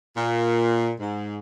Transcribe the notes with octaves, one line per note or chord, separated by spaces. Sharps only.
A#2
G#2